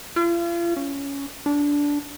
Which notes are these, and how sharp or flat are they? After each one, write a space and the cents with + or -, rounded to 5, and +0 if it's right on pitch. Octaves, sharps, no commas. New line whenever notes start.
F4 -40
C#4 +10
D4 -15